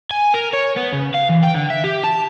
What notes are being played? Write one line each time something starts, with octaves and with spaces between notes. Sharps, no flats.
G#5
A#4
C#5
B3
C#3
F5
E3
G5
D3
E5
G4
A5